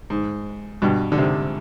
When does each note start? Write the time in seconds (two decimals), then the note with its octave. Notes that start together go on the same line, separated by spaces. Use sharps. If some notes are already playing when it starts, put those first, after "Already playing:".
0.10 G#2
0.82 G2 B2
1.12 D3
1.17 G#2 C3